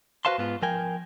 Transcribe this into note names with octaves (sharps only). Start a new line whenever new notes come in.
F#4 B4 C5 F5 A5 C6
G#2 B3 F4
F3 A#4 G5 G#5